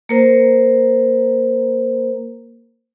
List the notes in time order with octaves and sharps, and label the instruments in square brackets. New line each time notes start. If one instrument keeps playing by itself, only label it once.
[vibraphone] A#3 A#4 C5